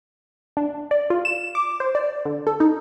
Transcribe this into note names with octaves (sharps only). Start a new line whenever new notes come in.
D4
D5
F4
E7
D6
C5
D5
D3
A4
D#4